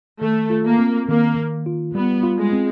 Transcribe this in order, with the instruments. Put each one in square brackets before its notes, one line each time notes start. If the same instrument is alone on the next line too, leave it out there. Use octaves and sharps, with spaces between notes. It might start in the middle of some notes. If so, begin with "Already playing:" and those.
[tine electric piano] D#3 [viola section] A3
[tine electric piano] F4
[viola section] A#3
[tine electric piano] C4
[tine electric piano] D#3 [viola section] A#3
[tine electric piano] D#3
F4
[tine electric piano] G3 [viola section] B3
[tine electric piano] F4
[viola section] G#3
[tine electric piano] C4